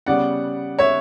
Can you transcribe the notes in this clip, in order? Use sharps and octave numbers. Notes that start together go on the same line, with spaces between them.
C#3 G3 B3 D5 F#5
C#5 E5